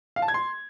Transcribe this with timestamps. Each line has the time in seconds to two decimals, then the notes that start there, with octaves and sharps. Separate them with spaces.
0.16 F5
0.22 A5
0.28 G#6
0.34 C6